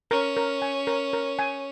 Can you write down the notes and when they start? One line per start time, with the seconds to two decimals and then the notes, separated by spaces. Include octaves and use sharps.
0.11 C#4 A#4
0.37 A#4
0.62 G#5
0.87 A#4
1.13 A#4
1.39 G#5